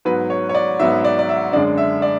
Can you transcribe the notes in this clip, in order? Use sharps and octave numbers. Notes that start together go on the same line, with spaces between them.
G#2 F#3 B3 B4
C#5
C#5
D5
G#2 F#3 B3 E5
D5
D5
E5
F#2 D3 G#3 D4 D5
E5
D5